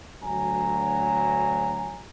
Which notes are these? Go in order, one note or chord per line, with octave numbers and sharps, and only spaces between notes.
D2 F#3 G#5 A#5